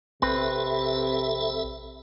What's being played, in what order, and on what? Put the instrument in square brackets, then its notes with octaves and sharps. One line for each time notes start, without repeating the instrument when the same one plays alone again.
[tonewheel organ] A#1 A4 E5 [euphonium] C3 [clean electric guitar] C4 B4